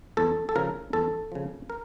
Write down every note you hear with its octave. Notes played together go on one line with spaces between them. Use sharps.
E2 A4
A4
C#3 F3 A#4
E2 A4
C#3 F3
A#4